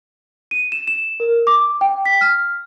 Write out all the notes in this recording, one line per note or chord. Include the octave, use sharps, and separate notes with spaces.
D#7
E7
E7
A#4
D6
G5
B6
F6